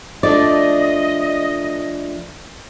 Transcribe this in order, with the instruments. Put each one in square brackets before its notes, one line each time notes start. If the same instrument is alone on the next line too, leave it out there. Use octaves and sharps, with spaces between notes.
[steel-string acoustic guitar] F3 A3 D4 [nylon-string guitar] D5 [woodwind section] D#5